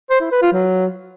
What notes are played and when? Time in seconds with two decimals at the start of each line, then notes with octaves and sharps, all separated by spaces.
0.10 C5
0.21 E4
0.31 B4
0.42 F4
0.52 F#3